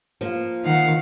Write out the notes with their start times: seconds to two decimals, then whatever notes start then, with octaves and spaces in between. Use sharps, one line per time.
0.21 F3 A#3
0.65 D#3 F5 F#5